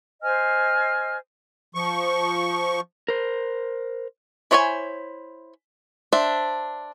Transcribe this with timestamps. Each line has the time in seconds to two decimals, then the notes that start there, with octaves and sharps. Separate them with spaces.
0.22 C5 D#5 G#5 F6
1.75 F3 C#6
3.08 A#4 C5
4.51 E4 C5 C#5 D#5 G#5
6.13 D4 C5 E5